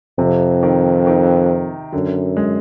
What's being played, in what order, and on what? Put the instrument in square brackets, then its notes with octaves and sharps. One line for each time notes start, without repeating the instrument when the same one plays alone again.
[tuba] F2 [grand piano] C3
[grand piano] D#3
D#3
[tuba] F#2 [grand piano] D3
[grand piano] G#3